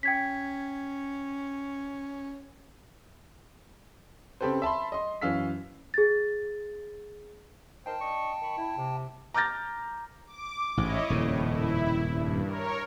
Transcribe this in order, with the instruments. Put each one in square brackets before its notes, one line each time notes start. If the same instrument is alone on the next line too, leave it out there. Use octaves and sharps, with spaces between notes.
[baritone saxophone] C#4 [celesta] G5 G#6 B6
[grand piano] C#3 C4 G4 A4 B4 C5
E5 A5 B5 C6
D#5 C6
F#2 E3 C#4 F5 E6 B6
[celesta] G#4 A6
[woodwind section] D#4 A#4 C5 [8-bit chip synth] G5 A5
[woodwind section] D4 D#5 C#6
D#3 B5 C#6
E4
C3
[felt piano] A#5 D6 F6 G6 A6 A#6
[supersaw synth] D6
[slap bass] A1 G#2 [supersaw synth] E4 C#5 D#5
[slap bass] D#1 F2 C#3 [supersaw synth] A2
[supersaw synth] E4
G2
A#4 C#5